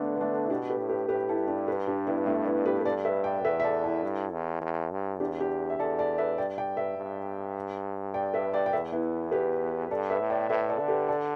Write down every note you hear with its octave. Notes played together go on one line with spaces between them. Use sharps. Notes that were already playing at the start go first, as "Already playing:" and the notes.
Already playing: D3 A3 B3 D4
B3
A3 D4
E4
B2 D4 G4
G4 B4
A2
G4 B4
A2 G4 B4
E4 A4
G2
D4 G4
G4 B4
D4 G4
B3 E4
A3 D4
B3 E4
G4 B4
B4
G2 A4 D5
B4 E5
D5 G5
E2 B4 E5
E5
A4 D5
E4 A4
G2
E2
E2
G2
E2 D4 G4
D4 G4
E5
E2 A4 D5
A4 D5
B4 E5
G2 D5 G5
D5 G5
B4 E5
G2
D5 G5
B4 E5
D5 G5
G5
E2 B4 E5
B3 E4
G4 B4
G2 A4 D5
B4 E5
A2
D5 G5
A2 B4 E5
A4 D5
D3
G4 B4
A4 D5